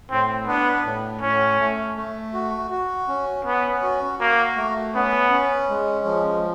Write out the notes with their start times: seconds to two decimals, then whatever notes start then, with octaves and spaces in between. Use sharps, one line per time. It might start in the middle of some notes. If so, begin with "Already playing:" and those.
0.10 A2 C4
0.47 B3 D4
0.85 A2
1.21 A2 C#4
1.59 A3
1.96 A3
2.33 F#4
2.71 F#4
3.08 C#4
3.45 B3 C#4
3.82 F#4
4.20 A#3 F#4
4.57 A3
4.94 B3 C#4
5.31 C#4
5.69 G#3
6.05 F3